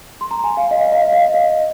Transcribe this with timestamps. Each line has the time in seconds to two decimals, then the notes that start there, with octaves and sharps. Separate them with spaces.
0.21 C6
0.31 A#5
0.44 G#5
0.57 F5
0.71 D#5
0.81 F5
0.92 D#5
1.02 F5
1.12 D#5
1.23 F5
1.34 D#5